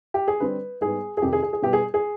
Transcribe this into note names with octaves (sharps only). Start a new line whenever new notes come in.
G4
G#4
D3 G3 C4 B4
G#2 G3 B3 G#4
G#4
F2 C3 D#3 G4
G#4
G#4
G#4
B2 G3 B3 G4
G#4
G#4